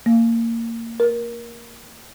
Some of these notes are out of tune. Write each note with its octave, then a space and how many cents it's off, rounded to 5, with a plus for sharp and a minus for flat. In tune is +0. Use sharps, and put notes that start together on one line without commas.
A#3 -20
A#4 +20